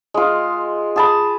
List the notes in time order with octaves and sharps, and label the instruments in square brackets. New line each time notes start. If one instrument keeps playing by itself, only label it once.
[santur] G#3 F4
G#4 A5 B5